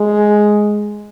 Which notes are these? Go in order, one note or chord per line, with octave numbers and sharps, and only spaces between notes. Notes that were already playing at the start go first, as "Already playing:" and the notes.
Already playing: G#3